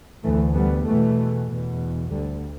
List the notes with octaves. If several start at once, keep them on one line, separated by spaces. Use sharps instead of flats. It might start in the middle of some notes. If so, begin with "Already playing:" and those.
D2 E3 A3
G3 B3
E2 B2 E3 A3
E2 B2
D2 D3 G3